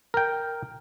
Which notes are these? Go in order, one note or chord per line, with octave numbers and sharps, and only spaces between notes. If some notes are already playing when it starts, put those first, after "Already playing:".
A#4 G5